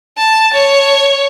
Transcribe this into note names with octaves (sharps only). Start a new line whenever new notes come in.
A5
C#5